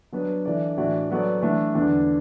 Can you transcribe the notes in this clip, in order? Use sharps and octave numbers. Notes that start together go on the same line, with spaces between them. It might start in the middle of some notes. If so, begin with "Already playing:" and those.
F#3 B3 D4 B4
E3 D4 A4 D5
A2 E3 D4 F#4 D5
F#3 B3 F#4 A4 D5
E3 A3 D4 A4 D5
E2 D3 B3 D4